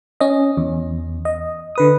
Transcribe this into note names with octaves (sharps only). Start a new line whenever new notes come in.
C#4 D#5
E2
D#5
D3 B4 D#6